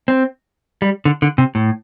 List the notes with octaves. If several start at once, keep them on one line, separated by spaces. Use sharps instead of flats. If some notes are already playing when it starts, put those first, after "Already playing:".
C4
G3
D3
D3
C3
A2